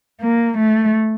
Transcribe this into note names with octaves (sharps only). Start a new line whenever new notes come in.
A#3
A3